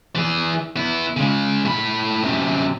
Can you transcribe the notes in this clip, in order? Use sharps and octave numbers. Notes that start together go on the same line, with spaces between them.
E3 G#4
B3 E4
C#3 G#3
A2 B5
F#2 C3